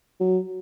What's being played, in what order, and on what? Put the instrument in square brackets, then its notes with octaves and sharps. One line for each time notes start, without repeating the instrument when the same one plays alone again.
[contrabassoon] F#3